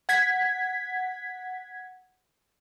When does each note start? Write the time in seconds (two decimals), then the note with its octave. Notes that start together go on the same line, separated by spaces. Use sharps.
0.09 F#5 G#6 B6